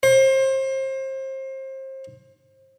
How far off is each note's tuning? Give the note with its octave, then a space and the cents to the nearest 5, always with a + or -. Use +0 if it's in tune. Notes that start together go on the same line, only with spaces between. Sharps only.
C5 +30